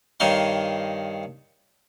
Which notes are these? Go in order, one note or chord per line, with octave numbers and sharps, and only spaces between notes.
G2 D#3 D#4 C#5 F5 C6